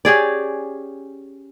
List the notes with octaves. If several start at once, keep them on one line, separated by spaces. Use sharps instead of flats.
C#4 G4 G#4 D5